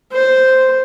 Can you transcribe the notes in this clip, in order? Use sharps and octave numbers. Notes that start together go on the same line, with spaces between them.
C5